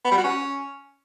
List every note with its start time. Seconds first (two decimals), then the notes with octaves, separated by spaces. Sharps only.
0.04 B3
0.11 G3
0.18 F#4
0.24 C#4